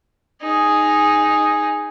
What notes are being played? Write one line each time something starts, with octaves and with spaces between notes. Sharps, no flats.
D#4 G#4